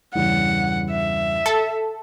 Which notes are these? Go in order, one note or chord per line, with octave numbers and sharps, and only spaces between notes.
E2 G2 C#3 F#5
E5
A4